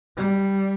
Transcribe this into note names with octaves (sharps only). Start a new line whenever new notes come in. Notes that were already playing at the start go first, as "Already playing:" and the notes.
G3